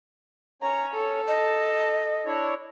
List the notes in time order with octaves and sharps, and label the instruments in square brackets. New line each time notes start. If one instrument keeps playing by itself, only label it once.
[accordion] C#4 C#5 [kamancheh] A#5
[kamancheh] A4
[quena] D#5 [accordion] A5
[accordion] D4 E4 C#5